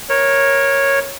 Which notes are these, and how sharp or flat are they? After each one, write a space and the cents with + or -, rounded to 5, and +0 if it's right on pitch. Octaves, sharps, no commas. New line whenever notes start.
A#4 +15 C#5 -10